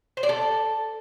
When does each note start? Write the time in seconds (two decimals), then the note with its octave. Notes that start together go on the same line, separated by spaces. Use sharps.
0.17 C5
0.23 D5
0.29 A4